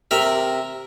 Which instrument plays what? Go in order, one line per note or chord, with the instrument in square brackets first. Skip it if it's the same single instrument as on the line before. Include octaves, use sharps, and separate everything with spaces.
[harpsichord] C3 A#4 E5